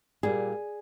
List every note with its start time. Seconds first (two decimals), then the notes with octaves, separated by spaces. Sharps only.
0.23 A#2 G3 G#4